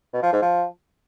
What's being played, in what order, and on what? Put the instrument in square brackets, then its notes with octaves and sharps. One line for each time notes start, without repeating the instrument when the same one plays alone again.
[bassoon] B2
F3
G#2
F3